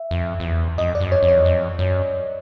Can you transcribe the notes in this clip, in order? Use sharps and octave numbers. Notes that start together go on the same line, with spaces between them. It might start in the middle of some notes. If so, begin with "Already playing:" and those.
Already playing: E5
F2
F2
E2
F2 D#5
D5
F#2
C#5
F2
C#5
E2
F2
F#2